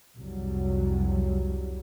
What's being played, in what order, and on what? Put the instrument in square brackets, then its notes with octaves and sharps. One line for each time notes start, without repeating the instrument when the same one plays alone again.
[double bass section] C2 F2 F#3 G3